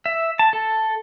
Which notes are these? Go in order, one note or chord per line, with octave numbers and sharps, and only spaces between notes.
E5
A5
A4